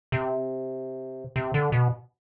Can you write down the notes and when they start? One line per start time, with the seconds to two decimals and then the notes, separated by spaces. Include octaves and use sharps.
0.12 C3
1.36 C3
1.54 D3
1.72 B2